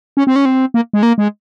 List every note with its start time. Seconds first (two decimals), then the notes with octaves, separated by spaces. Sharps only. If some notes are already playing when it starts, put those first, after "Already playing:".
0.17 C#4
0.27 C4
0.36 C#4
0.45 C4
0.74 A#3
0.93 G#3
1.03 A#3
1.18 G#3